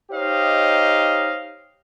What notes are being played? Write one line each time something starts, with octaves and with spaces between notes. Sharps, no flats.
D#4 G4 C5 C#5 D#5 F5